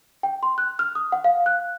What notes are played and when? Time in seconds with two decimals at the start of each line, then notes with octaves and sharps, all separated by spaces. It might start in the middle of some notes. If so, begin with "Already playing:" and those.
0.23 G5
0.43 C6
0.58 F#6
0.79 F6
0.95 D#6
1.12 F#5
1.24 F5
1.46 F#6